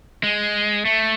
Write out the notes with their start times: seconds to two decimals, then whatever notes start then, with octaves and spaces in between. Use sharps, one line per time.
0.23 G#3
0.85 A3